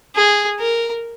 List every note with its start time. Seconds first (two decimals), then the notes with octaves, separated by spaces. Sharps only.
0.16 G#4
0.60 A#4